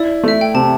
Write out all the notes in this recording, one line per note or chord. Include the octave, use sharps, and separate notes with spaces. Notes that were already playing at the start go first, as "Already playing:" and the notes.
Already playing: E4 D5
A3 E5
G5
C3 A5